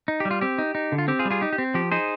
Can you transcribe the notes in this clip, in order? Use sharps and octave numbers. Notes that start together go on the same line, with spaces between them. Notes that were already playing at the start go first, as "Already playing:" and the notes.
D#4
G4
G3
F4
C4 G4
D#4
D#4
D3
F4
C4 G4
F4 G#4
G3
F4 G#4
D#4 G4
G4
C4
F3 G4
D#4 G#4 C5